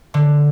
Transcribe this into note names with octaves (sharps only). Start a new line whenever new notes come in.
D3